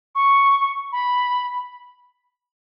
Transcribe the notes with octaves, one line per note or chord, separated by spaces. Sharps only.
C#6
B5